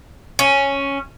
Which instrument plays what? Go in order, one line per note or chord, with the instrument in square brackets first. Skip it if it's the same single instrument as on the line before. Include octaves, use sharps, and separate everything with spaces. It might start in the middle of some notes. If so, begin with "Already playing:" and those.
[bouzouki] C#4